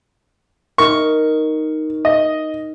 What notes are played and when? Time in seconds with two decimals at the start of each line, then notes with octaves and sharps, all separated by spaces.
0.78 D#4 A#4 C#6
2.05 D#5